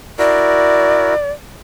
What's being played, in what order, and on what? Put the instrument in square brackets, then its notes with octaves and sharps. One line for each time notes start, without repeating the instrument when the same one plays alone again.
[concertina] E4 F#4 A#4 [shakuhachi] D5